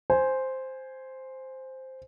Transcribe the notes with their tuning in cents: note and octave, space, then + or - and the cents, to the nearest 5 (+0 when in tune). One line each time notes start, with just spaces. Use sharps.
C5 +0 G#5 +0